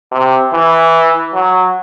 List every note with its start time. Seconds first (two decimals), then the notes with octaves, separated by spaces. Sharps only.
0.12 C3
0.53 E3
1.34 F#3